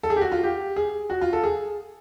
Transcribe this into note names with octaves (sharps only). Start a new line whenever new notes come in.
A4
G#4
G4
F#4
F4
G4
G#4
F#4
F4
A4
G#4